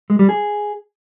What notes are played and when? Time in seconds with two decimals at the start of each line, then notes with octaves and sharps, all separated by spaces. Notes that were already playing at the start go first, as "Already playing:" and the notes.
0.10 G#3
0.19 G3
0.29 G#4